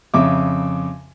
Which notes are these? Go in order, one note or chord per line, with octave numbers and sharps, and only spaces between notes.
F2 C#3 E5 D6